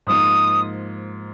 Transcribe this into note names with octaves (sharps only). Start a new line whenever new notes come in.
G#2 F3 A#3 D#6